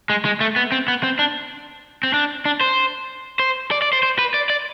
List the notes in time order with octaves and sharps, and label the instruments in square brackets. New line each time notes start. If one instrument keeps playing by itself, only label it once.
[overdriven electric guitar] G#3
G#3
A3
B3
C4
B3
C4
D4
C4
D4
D4
C5
C5
D5
D5
C5
C5
B4
D5
D5